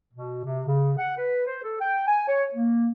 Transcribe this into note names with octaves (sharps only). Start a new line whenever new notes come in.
B2
C3
C#3
F#5
B4
C5
A4
G5
G#5
C#5
A#3